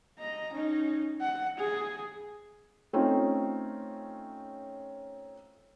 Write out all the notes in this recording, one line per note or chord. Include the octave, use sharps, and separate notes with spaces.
D#5 A#5
C#4 D#4
F#5
G#4
A3 C4 C#4 D#4 F4